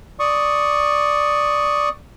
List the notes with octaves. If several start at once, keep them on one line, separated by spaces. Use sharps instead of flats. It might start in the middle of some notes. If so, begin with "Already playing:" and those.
D5 C#6 D#6